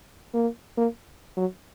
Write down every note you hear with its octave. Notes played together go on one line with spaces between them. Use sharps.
A#3
A#3
F#3